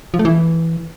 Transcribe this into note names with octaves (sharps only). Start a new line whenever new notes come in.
F3
A3
E3